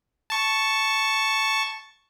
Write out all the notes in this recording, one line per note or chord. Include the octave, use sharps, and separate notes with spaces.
A5 C#6